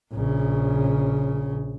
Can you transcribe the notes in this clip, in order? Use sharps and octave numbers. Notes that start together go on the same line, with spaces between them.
A#1 C#3